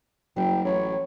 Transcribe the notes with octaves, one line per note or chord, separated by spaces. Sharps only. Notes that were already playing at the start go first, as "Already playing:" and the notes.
F#1 F#3 G5
A1 C#5